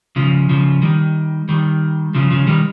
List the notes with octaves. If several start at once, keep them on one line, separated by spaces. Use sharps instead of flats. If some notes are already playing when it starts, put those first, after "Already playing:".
C#3 F3
C#3 F3
D#3 G3
D#3 G3
C#3 F3
C#3 F3
D#3 G3